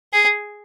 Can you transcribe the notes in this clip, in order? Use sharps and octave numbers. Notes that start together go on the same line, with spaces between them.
G#4